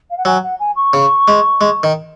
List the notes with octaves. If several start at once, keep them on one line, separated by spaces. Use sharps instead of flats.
F5
F#5
F#3 G#5
F#5
G#5
C#6
C#3
G#3
G#3
D#3